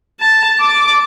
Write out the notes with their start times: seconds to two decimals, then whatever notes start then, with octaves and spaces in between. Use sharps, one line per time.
0.20 A5
0.60 D6